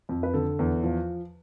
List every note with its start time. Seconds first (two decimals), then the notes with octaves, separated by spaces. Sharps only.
0.09 F2
0.23 B4
0.34 D3 A4
0.59 E2
0.84 F3